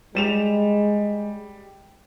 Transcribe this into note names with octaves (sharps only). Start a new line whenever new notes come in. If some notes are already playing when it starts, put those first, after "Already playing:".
G3 G#3 E7 F7